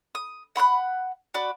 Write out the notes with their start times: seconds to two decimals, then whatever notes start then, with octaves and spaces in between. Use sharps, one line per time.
0.15 D#6
0.56 F#5 B5 C#6 F#6
1.34 F#4 D5 B5